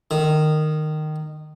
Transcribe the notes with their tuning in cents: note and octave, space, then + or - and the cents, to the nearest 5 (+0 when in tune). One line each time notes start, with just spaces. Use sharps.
D#3 -15